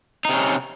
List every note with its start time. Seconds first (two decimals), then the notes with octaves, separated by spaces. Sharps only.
0.25 D#4
0.29 C3
0.34 C#4